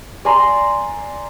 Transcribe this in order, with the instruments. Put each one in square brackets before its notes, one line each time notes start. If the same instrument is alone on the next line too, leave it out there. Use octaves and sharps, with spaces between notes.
[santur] D5 G#5 A#5 C6